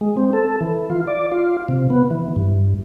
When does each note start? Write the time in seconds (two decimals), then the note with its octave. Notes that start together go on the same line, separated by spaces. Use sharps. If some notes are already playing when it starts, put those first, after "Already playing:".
0.01 G#3
0.17 C4
0.33 A4
0.61 E3
0.90 F4
1.07 D5
1.32 F4
1.68 C3
1.90 B3
2.11 E3
2.36 G2